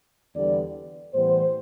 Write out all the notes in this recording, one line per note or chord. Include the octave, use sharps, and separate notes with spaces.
E2 D3 G3 B3 D5
A2 E3 G3 B3 C5